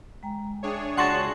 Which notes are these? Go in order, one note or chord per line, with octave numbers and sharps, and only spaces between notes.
G#3 G5 A#5
D4 G#4 C#5 E5 G5
C#2 F#4 F#5 A5 C6 C#6